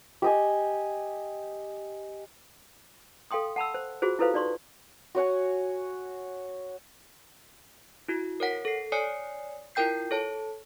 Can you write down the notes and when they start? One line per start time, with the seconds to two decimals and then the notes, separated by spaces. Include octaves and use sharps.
0.22 G4 D#5 G#5
3.31 A4 F5 G5 C6 D#6
3.56 F#5 A5 B5 E6
3.74 C5
4.02 F4 F#4 G#4 C5
4.19 E4 F4 A4 B4 C5 F5
4.34 D#4 D5 C6 C#6
5.15 F#4 C#5 F#5 G#5
8.08 E4 F#4
8.40 A#4 C#5 F#5 B6
8.65 A4 C7
8.92 C#5 D5 G#5 D#6 C7 C#7
9.75 E4 F4 A#4 G5 G6 C7
10.11 A4 C#5 A5